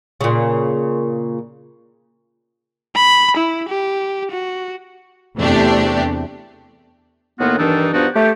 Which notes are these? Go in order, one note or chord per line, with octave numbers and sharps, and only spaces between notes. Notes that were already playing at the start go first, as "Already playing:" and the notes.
A#2 C#3
B5
E4
G4
F#4
E2 C3 A3 D4 G4
A2 D#3 A#3 B3 F4 F#4
G2 D#3 E3 D4 D#4 A4
G2 F3 B3 D4 D#4 F#4
A3 G4